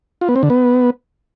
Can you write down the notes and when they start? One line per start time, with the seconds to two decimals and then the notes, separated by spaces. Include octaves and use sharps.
0.21 F4
0.29 B3
0.36 C4
0.43 D3
0.50 B3